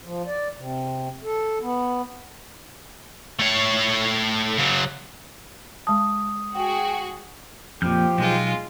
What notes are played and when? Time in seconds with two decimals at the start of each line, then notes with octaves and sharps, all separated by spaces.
0.04 F3
0.26 D5
0.57 C3
1.24 A4
1.61 B3
3.39 A3 C#5
4.58 C#3 F#3
5.87 G#3 A5 D#6
6.55 F#4 G#4 G5
7.82 F2 A#2 F3 G4 F6 G6
8.18 B1 G#3 F4